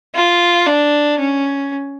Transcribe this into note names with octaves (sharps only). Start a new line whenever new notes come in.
F4
D4
C#4